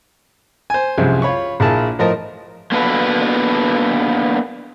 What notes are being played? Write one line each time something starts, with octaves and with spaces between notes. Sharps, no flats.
C5 G#5
C2 F#2 F3 G3 G#3
F4 C#5 B5 C#6
A#1 A#3 E4 G#4 A5
A2 F3 A#4 D#5 A5
A#3 B3 D4 F#4 A4 B4